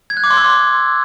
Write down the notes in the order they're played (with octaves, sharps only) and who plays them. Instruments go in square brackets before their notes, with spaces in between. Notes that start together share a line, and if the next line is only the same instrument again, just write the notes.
[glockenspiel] G#6
F#6
D6
C6
E6